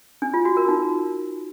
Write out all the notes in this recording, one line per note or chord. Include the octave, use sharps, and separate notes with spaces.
D4
F4
F#4
A#4
D#4